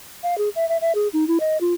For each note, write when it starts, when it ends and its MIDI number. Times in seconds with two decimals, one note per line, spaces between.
0.23 0.37 77
0.38 0.49 68
0.55 0.68 76
0.69 0.77 76
0.81 0.92 76
0.95 1.08 68
1.13 1.26 63
1.28 1.38 64
1.40 1.57 75
1.61 1.74 65